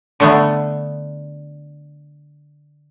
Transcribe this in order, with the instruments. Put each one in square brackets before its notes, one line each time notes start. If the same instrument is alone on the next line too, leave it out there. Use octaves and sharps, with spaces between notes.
[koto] D3 A3 B3